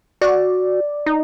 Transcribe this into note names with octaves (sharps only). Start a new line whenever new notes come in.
F#4 D5
D#4